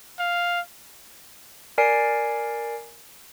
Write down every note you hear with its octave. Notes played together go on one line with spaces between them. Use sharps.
F5
A#4 D5 G#5 C7 D7